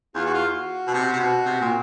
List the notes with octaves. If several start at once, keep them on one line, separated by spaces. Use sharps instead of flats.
E2 F4
F#4
F4
F#4
B2
C3
C3
B2
C3
A#2